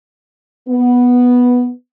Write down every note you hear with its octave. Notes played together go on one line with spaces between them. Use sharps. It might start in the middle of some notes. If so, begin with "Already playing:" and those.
B3